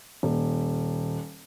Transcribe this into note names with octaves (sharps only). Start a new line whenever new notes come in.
D#1